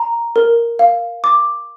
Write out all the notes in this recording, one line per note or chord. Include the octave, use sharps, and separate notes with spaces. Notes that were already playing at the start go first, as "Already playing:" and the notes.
Already playing: A#5
A#4
F5
D6